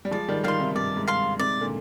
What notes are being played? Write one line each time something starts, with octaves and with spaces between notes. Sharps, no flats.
G3
F3 G#3 D5
D#3 G3
D#3 G3 F5 C6
C3 D#3
G2 D5
G#2
F5 C6
G#2 C3 D5
A#2 D3